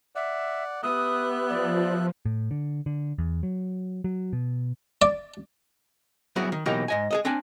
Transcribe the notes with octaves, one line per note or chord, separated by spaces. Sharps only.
D5 E5 F#5
B3 G4 E5 D#6 F#6
F3 D5
A2
D3
D3
E2
F#3
F#3
B2
D5
F#3 G3 B3 E4 F#4 G#4
D#3
B2 E3 F#3 A#3 D#4 G4
G#2 D#5 G#5
G#4 A4 D#5
C4 D4 G5 G#5